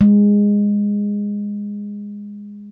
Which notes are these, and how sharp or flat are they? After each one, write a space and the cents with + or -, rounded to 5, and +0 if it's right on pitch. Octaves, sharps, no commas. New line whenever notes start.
G#3 -15